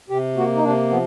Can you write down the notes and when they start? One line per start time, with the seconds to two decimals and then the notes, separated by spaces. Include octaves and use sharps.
0.10 C3 G4
0.37 A#3 F#4
0.56 D#4
0.64 C3 D4
0.90 F3 B3